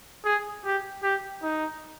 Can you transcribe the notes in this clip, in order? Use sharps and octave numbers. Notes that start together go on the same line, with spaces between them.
G#4
G4
G4
D#4